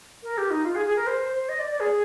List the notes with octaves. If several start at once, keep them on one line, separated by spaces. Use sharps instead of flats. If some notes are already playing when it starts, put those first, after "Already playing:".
A#4
G4
D#4
F4
G#4
G#4
A#4
C5
C5
D#5
D5
D5
G#4